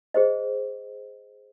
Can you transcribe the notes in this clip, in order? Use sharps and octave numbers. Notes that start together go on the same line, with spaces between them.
G#4 C5 D#5